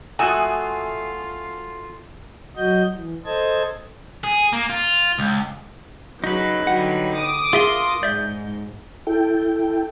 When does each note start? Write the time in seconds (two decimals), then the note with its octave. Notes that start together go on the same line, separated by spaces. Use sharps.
0.19 A3 F4 F#4 E5 G#5 D#6 F#6
2.57 F#3 F#4 D#5 G6
2.95 E3
3.26 A4 C5 D#5 A5 G#6
4.24 G#4
4.53 A#3
4.69 F4
5.19 C#2
6.24 C#3 F#3 D#4 B4
6.67 D3 F#3 G3 F#5
7.18 D6 D#6
7.53 F4 G#4 A#4 E5 F5 C6
8.03 G#2 D5 E5 G6
9.07 E4 A4 G5